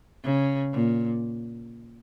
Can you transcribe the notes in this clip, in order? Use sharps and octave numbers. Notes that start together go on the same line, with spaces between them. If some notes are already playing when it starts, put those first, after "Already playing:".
C#3
A#2